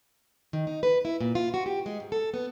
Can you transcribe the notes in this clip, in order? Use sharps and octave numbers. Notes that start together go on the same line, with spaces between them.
D#3
D#4
B4
E4
A#2
F4
F#4
G4
G#3
G#2
A4
B3